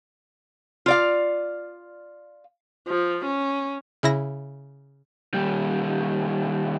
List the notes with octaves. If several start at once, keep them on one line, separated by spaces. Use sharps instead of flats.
F4 D5 F5
F3
C#4
C#3 E4 A#6
D#2 G3